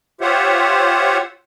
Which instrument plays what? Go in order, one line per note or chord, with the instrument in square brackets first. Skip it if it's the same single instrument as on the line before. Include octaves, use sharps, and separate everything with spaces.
[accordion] F4 G4 C5 C#5 E5 F#5